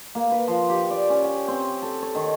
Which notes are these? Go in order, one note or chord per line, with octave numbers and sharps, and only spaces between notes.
A#3
B4
F3
G4
D5
C#4
G5
C4
A4
C#5
D#3